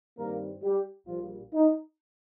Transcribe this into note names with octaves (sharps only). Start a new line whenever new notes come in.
G2 D#3 G3 A#3 C4 A#4
G3 G4
A#1 A#2 F3 G3 A#3 F4
D#4